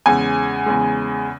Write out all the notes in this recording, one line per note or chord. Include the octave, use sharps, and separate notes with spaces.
E2 C#3 G#3 G#5
E2 C#3 G#3